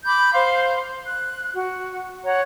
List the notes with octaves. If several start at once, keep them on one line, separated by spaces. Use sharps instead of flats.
B5 D6 G6
C5 F5 C6
F#6
F#4
C#5 F#5 A#5